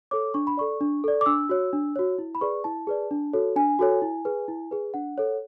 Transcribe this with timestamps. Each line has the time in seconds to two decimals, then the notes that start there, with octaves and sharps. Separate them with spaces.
0.11 A4 C#5 D6
0.34 D4 C#6
0.47 B5
0.57 A4 D5 C#6
0.81 D4
1.04 A4 D5
1.21 D6
1.26 D4 E6
1.49 F#4 C#5
1.73 D4
1.96 F#4 C#5
2.18 E4
2.35 B5
2.41 G#4 B4 D5 C#6
2.64 E4 A5
2.87 G#4 B4 D5
3.11 D4
3.33 F#4 A4 C#5
3.56 D4 G#5
3.79 F#4 A4 C#5
4.02 E4
4.25 G#4 B4
4.48 E4
4.71 G#4 B4
4.94 D4 F#5
5.18 A4 C#5